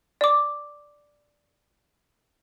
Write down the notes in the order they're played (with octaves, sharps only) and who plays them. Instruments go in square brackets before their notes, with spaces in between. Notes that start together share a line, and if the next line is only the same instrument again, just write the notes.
[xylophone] D5 D6